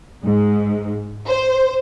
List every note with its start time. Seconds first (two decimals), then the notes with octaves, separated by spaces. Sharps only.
0.25 G#2
1.27 C5